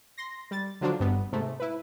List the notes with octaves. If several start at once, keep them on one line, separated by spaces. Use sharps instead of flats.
C6 A#6
G3 A6
D3 F3 F#3 D4 F4
G1 G2 B3
G#2 C3 A3
E4 B4